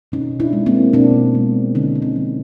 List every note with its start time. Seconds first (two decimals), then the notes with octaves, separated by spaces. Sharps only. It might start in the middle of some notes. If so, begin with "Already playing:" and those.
0.12 B2 C#4 D#4
0.40 D4 E4
0.53 G#3
0.66 A#3 C4
0.93 B2 C4 D4
1.35 G#3
1.75 D3 C#4 D#4
1.96 D#4
2.02 C4 D4
2.16 F3